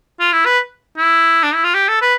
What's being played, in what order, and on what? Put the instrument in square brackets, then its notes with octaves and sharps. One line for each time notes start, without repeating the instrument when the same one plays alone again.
[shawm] F4
E4
B4
E4
D4
E4
F4
G4
A4
B4